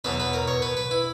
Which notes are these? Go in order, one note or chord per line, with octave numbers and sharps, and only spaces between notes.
E2 B2 F#3 B4
B4
A#4
C#5
B4
B4
E4